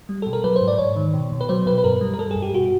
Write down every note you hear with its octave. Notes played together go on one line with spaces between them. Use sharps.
G3
B2 A4
A#4
F#3 B4
C5
G#2
D5
G#2 C#5
D#3
B2
B2
B4
F#3 C5
B2 B4
B4
G2 A#4
G3
A#4
G3 A4
G2 G#4
G4
B2 F#4